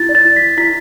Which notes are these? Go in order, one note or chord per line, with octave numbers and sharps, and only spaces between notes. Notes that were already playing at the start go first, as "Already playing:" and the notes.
Already playing: E4 A6
D5
A6
E4
E4 B6
E4 B6